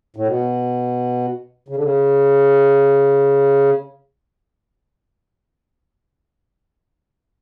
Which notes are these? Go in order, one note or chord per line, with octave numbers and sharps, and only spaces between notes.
A2
B2
C#3
D3
C#3